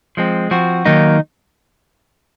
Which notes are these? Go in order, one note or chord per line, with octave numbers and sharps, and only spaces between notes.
F3 G#3 C4
F3 C4 F#4
D#3 F#3 A#3 D#4